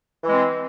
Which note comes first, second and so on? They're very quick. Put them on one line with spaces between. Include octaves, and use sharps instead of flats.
E3 G#3 C4